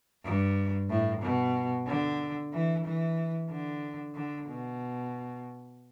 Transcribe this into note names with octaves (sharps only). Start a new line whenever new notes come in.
G2
A2
B2
D3
E3
E3
D3
D3
B2